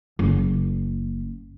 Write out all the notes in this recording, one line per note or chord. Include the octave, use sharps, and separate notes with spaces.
F#1